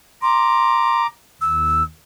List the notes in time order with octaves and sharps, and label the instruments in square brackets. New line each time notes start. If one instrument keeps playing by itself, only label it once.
[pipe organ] A#5 D6 [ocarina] C6
[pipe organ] D#2 [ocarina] E6